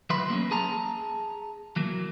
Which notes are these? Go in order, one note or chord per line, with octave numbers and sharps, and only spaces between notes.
E3 F#3 B4 E5 B5 C6
F#3 A#3 C4 C#4
G#4 A5 A#5
E3 F#3 A#3